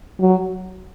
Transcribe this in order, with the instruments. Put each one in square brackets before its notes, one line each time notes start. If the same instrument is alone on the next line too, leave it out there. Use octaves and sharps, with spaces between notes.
[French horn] F#3